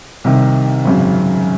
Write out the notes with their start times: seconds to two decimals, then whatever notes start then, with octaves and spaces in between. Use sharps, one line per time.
0.24 C2 C3 D#3
0.85 G#1 F#2 C#3